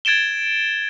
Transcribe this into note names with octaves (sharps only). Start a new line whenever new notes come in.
G#6 A6 D7 E7 G7